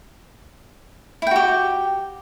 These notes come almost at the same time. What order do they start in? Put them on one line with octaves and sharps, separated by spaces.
E4 G5 F#4 G4